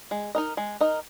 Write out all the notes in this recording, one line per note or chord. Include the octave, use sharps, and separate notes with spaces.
G#3
D#4 A#4 D#5
G#3
D#4 A#4 D#5